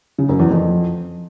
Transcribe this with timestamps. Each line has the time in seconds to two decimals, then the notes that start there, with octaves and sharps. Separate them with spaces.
0.18 C#3
0.29 F#2
0.40 E2
0.50 F2